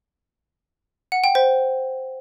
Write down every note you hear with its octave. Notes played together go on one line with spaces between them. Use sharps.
F#5
G5
C5